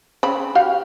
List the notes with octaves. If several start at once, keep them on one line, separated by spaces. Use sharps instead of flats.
C#3 C4 B5
F#4 G4 F5